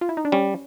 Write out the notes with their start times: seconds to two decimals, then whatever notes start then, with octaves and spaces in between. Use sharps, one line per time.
0.01 F4
0.09 E4
0.17 D#4
0.25 D4
0.32 G3 C#4